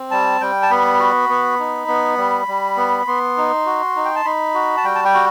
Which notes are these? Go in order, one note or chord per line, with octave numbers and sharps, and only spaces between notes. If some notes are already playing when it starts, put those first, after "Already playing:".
Already playing: C4
G3 A5
G3 G5
A5
B3 B5
F#4
B3
D#4
B3
G3
G3
B3
B3 C6
D#4
F#4
D#4
G5
A5
D#4 B5
F#4
A5
G3 G5
A5
G5
F#4